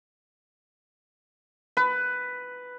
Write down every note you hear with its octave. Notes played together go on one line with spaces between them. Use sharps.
B4